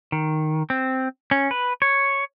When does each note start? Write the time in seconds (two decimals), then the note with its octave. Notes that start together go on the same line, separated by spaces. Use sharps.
0.12 D#3
0.70 C4
1.31 C#4
1.51 B4
1.82 C#5